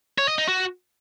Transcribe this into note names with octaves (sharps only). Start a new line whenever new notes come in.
C#5
D#5
D#4
F#4